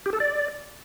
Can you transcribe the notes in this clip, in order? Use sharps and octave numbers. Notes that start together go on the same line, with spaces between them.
G4
A4
D5